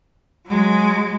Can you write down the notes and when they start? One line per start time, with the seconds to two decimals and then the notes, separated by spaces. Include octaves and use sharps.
0.46 F#3 G#3